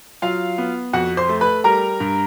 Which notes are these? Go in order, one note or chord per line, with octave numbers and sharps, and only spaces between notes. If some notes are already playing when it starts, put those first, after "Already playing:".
F#3 F4 F5
B3
F2 F#4 F#5
C5 C6
A3
B4 B5
G3 A#4 A#5
G2